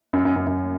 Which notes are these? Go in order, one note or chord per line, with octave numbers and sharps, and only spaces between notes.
F#2
F#2
F#2
F#2